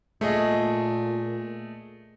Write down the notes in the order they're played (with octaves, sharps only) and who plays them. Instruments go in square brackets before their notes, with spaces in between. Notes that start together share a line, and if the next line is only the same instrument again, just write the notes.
[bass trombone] A#2 [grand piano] A3 G#4 D#5